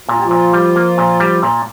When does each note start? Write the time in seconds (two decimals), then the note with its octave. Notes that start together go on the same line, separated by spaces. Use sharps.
0.08 A#2 F4
0.16 G4
0.24 F3 F4
0.31 A#2
0.53 G3
0.76 A#3
0.98 A#2
1.20 G3
1.43 A#2